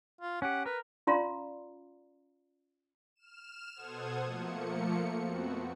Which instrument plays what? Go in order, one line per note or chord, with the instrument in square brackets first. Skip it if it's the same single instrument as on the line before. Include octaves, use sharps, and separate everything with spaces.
[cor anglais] F4
[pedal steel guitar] C#4 G4 [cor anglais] F#5
[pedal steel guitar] A#4 [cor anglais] B4
[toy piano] C#4 F4 D5 F5 A#5 C6
[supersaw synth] F6 E7
B2 A4 C5 F#5 D#6 G#6
F3 A3 A#3 C#7
F2 B3 C4 F#4